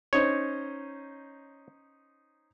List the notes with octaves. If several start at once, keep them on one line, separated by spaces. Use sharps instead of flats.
C#4 D#4 C5 C#5